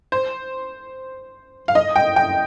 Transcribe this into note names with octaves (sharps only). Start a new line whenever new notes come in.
C5
F5
D#5
G5
G5